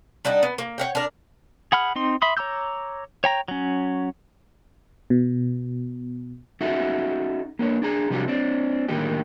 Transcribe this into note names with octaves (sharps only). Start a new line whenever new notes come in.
G3 D4 D#4 F#5
B3
A#3
C#5 F#5 G5
D4 A#4
G#4 F#5 B5 F6
C4 D#4 C6
E5 B5 C6 D#6
C#5 A#5 D6 E6 G6
C#5 G5 A#5
F#3 C#4
B2
C#4 D#4 F#4 A4 E5
A#3 D4 C#5
D4 G#4 A#5
C3 F3 G3 D4 F#4 G4
C4 D4
A2 D3 D#3 A#3 D#4 G4